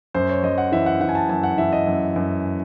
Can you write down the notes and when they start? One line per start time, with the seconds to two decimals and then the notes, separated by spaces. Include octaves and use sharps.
0.14 F#2 C5
0.29 C#5
0.43 F#2 D#5
0.58 F#5
0.72 E3 E5
0.86 F#5
1.01 E3 F#5
1.09 G#5
1.15 A5
1.29 F#2 G#5
1.43 F#5
1.58 E3 E5
1.73 D#5
1.87 F#2
2.16 F#2